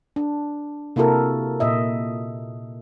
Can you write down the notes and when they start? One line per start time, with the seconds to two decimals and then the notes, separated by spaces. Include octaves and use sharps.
0.16 D4
0.96 C3 A#3 E4 F#4 A4 A#4
1.60 A#2 D#5 E5